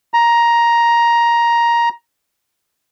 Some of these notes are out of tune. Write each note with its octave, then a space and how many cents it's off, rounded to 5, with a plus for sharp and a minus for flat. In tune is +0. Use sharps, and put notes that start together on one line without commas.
A#5 +10